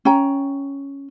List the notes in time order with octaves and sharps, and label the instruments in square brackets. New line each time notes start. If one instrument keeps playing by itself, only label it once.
[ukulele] C#4 G5 A#5